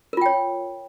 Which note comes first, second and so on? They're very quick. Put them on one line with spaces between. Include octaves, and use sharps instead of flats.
A#4 F4 G5 C#5